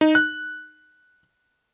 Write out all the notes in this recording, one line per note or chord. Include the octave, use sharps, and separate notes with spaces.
D#4
F#6